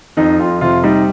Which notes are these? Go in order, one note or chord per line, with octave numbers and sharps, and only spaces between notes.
F2 D#4
F2 F4
C3 F4
G3 D#4